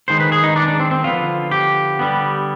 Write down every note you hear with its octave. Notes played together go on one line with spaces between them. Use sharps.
D#3 G#3 B3 C5
B4
G#4
D#4
D4
D4
C4
C4
D3 F3 B3 F4
G4
D3 G3 B3